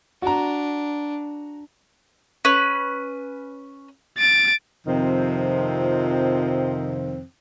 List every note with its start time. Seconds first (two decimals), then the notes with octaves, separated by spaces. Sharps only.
0.22 D4 F#4 A#5
2.45 C#4 B4
4.19 A6 D7
4.87 F2 C3 D#3 F3 C4